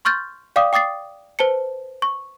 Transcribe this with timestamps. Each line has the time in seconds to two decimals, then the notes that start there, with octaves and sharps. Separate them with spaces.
0.05 C6 C#6 F6 G6 A6
0.56 D5 F5 G5 D6 D#6
0.73 G5 D6 D#6 A6 C7
1.39 B4 C5 A5 C#7
2.02 C#6